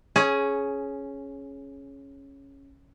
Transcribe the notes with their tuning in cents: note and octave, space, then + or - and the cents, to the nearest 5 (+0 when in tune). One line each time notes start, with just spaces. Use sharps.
C#4 -5 G#4 +15